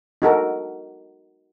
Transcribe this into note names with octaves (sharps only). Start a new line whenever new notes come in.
D#4 F#4 A4 A#4